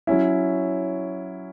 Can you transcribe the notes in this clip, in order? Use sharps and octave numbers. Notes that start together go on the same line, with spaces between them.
F#3 C#4 E4